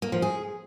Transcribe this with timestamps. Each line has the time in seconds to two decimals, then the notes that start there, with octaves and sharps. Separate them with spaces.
0.02 A#3
0.12 F3
0.22 G#4